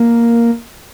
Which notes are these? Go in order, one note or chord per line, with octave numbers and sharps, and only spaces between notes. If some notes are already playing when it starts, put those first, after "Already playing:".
Already playing: A#3